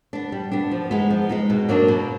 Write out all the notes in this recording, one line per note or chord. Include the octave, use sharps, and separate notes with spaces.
B3 D4
G3
B3 D4
F3
G#3 B3 D#4
F3
G#3 B3 D#4
B2
F#3 A#3 D4
B2